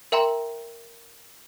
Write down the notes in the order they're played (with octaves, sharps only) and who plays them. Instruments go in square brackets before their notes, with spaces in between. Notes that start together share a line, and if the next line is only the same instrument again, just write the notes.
[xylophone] A#4 E5 G5 A#5 C6